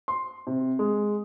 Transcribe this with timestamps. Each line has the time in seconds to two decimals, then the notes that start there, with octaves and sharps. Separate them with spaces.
0.08 C6
0.47 C3
0.79 G#3